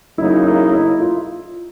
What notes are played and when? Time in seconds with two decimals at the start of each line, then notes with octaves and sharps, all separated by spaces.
0.18 C#3 F#3 A#3 D#4 E4
0.46 E4
0.73 E4
1.00 F4